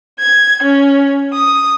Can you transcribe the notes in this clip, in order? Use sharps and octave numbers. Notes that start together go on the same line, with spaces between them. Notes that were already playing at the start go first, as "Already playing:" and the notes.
G#6
C#4
D#6